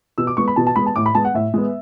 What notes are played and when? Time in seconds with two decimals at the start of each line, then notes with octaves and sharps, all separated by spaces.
0.18 B2 E6
0.27 D6
0.37 G#3 B3 C#6
0.48 B5
0.56 B2 A5
0.67 A5
0.76 G#3 B3 B5
0.86 A5
0.96 A2 D6
1.06 B5
1.15 G#3 B3 A5
1.25 F#5
1.35 A2 E5
1.54 G#3 B3